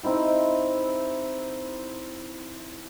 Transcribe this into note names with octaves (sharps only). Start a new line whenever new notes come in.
C4 D#4 E4 G4